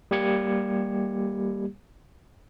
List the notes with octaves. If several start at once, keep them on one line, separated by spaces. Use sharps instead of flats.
G3 A#3 G4 G#6 C#7